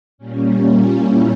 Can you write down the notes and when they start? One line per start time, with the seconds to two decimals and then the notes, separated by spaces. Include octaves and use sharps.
0.18 A#2 G3 A#3 C#4
0.94 E4